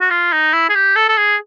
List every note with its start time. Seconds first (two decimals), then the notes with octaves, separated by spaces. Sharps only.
0.01 F#4
0.10 F4
0.32 D#4
0.53 E4
0.69 G#4
0.75 G4
0.96 A4
1.08 A4
1.17 G#4